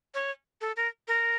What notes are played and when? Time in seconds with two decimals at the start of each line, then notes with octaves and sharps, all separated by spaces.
0.14 C#5
0.61 A4
0.77 A#4
1.08 A#4